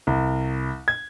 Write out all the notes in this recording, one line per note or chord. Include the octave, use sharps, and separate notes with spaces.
C2
G#6